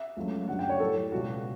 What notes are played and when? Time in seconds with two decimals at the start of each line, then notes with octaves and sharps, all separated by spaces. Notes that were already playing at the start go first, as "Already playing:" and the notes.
Already playing: E5
0.17 C#2 C#3 F#3 A3
0.48 F#2 D3 G3 F#5
0.59 G5
0.69 C#5
0.80 A2 G3 A4
1.12 C#2 B2 G3 F#4